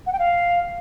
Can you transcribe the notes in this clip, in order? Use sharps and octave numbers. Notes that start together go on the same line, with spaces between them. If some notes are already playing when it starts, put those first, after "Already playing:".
F#5
G5
F5